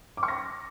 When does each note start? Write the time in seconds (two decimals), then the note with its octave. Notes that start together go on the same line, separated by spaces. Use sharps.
0.17 D6
0.23 C#6
0.28 A#6